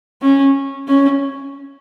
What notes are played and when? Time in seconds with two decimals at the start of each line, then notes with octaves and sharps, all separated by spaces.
0.22 C#4
0.88 C#4